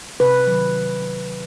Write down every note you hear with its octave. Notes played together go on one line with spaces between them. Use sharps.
C3 B4
D#3 F#3